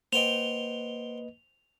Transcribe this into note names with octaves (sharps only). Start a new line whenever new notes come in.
A#3 B4 C5 D#5 F#5 G5 F7